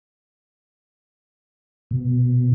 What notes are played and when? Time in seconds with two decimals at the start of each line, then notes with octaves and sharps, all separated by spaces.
1.91 B2